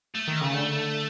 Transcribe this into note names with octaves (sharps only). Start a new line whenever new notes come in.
A3
D#3
C#3
D3